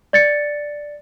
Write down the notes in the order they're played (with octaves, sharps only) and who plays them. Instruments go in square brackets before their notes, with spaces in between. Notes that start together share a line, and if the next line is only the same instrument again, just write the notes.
[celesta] D5 A6 C#7